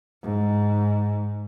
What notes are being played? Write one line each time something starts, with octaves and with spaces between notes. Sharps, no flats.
G#2